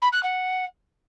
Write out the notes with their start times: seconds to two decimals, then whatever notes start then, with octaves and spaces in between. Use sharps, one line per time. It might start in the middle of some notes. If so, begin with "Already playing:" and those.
0.02 B5
0.12 F#6
0.23 F#5